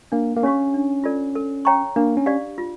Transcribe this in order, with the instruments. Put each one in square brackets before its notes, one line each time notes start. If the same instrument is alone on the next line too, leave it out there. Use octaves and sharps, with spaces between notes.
[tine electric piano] A#3 [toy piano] D4
[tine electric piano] A#3
[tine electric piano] C#4 [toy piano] G4 C#5 F5 C#6
[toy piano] D4
F4 A4 D5
A4
C#5 G5 A#5 C#6
[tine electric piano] A#3 [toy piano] D4
[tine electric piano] C#4
[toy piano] G4 D5 F5
F4